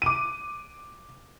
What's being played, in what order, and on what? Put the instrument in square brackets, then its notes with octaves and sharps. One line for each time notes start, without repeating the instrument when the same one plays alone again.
[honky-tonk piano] D6 D#7